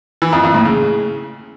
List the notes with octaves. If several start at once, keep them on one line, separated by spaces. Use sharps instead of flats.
E3
F2
F2
A2
C#3